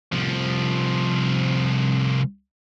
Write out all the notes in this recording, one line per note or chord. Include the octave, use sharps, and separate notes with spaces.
C2 F3